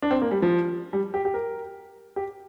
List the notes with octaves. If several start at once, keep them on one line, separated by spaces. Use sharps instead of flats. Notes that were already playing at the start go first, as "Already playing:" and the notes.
D4
C4
A#3
G3
F3
G3
G4
G4
A#4
G4